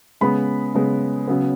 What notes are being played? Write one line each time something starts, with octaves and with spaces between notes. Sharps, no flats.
C#3 G#3 B3 B5
C#3 G#3 B3
C#3 F#3 B3